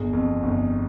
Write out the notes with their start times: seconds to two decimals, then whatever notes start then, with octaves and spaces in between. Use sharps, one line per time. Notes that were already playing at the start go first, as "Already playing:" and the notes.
Already playing: G1 G#4
0.13 F2
0.43 G1